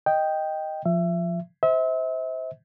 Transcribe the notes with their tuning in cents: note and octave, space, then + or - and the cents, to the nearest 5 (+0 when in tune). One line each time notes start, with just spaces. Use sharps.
D#5 +0 G5 +0
F3 +0 E5 +25
C5 -10 E5 -35